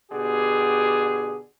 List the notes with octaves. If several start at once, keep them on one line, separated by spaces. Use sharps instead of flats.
B2 D3 G4 G#4